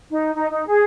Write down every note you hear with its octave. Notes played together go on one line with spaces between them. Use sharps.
D#4
D#4
D#4
G#4